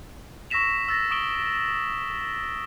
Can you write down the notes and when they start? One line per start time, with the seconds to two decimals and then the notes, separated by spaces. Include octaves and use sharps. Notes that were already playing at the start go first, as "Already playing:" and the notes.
0.50 C#6 E6 A#6 B6 E7 F7
0.88 E6 A6 A#6
1.11 C#6 D#6 D7 E7 G7